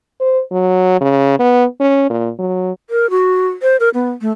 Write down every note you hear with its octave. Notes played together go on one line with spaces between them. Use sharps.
C5
F#3
C#3
B3
C#4
A#2
F#3
A#4
F#4
C5
A#4
B3
A3